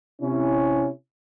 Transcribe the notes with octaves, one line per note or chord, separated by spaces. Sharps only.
C3 C#4 E4